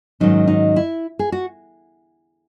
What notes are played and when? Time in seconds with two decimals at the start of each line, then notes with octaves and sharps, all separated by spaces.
0.20 G#2 D#3 F#3 C#4 D#4
0.48 D#4
0.76 E4
1.19 G#4
1.32 F#4